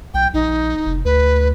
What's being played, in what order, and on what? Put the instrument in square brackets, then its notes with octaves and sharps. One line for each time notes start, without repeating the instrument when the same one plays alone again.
[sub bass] B1 [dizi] G5
[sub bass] A#1 [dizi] D#4
[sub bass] F1
[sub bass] D2 [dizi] B4